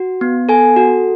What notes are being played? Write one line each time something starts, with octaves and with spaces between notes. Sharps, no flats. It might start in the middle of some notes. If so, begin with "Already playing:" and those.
Already playing: F#4
B3
A4 G#5
F#4